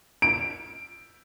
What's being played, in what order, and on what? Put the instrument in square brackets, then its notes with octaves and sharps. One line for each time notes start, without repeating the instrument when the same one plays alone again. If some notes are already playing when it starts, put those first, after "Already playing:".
[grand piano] D7